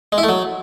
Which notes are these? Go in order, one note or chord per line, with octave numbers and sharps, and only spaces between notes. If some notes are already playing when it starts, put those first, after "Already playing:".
G#3
E4
A3
F#3